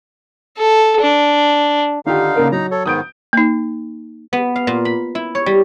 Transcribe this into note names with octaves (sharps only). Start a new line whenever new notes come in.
A4
D4
D3 D#3 D#4 F4 G4 F5
C#3 A#3 A#4
F#3 D#4 A#5
A4 C#5
G#2 D#3 B3 D#6 G6 D7
A#3 D#4
B3
F5
A#2
B5
E4
C#5
G3